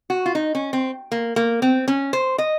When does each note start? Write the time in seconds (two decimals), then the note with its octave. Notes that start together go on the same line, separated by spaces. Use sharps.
0.10 F#4
0.26 F4
0.35 D#4
0.55 C#4
0.73 C4
1.12 A#3
1.36 A#3
1.62 C4
1.88 C#4
2.13 C5
2.38 D#5